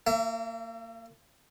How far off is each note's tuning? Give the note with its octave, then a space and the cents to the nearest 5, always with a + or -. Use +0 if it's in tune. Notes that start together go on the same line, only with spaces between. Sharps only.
A#3 -30 E5 +35